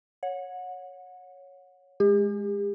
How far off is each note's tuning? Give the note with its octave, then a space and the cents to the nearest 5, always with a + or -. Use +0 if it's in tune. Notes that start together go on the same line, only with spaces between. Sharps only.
C#5 +0 F#5 -25
G#3 +0 G4 +45